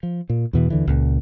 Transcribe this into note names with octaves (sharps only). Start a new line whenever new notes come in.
F3
A#2
E2 B2 E3
D#2 D3 E3
C#2 A#2